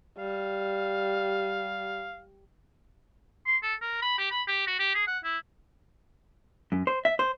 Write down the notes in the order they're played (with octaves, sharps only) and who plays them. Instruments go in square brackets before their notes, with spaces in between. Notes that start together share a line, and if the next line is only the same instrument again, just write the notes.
[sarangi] G3 [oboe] F5
[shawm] C6
A4
A#4
B5
G4
B5
G4
F#4
G4
G#4
F#5
E4
[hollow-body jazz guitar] F#2
C5
E5
C5